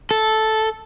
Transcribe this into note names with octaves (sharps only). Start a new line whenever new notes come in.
A4